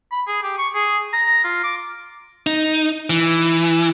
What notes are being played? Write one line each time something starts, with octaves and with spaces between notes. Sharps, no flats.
B5
G#4
G4
C#6
G#4
A#5
F4
D6
D#4
E3